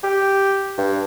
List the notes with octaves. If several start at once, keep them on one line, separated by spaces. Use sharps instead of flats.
G4
G2